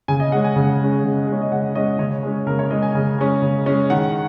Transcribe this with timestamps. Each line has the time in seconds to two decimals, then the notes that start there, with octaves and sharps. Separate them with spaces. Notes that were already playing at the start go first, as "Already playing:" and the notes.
0.08 C#3 G#5
0.20 D#5
0.32 G#3 C#4 F#5
0.44 G#5
0.56 C#3
0.80 G#3 C#4
1.04 C#3
1.27 G#3 C#4
1.42 D#5
1.52 C#3 F#5
1.75 G#3 C#4 D#5
1.99 C#3 C#5
2.23 G#3 C#4
2.47 C#3 A#4
2.59 C#5
2.71 G#3 C#4 D#5
2.82 G#5
2.94 C#3
3.19 G#3 C#4
3.42 C#3
3.66 G#3 C#4
3.90 D#3 F#5